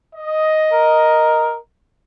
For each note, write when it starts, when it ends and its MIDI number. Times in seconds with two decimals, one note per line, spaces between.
0.15 1.56 75
0.72 1.56 70